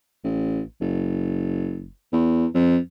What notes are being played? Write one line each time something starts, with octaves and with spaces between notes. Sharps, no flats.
A1
F#1
E2
F2